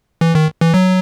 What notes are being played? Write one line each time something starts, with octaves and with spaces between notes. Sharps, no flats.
E3
D#3
E3
F#3